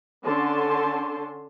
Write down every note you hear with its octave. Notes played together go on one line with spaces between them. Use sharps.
D3 C#4 A5 C6